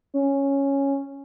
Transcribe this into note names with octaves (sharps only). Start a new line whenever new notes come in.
C#4